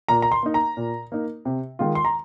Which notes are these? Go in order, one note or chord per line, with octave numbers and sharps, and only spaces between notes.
A#2 A#5
A#5
C6
A#3 D#4
A#5
A#2
A#3 D#4
C3
D#3 G#3 F4
C6
A#5